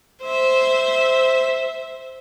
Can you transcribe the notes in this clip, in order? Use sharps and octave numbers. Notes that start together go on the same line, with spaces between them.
C5 E5